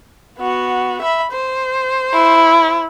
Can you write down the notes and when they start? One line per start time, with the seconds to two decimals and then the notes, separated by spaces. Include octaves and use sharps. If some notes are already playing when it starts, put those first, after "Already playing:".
0.39 B3 F#4
1.02 E5 B5
1.32 C5
2.14 E4